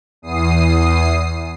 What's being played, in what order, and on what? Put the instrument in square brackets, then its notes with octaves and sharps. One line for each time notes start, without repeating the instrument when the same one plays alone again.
[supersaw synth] E2 D#6 C7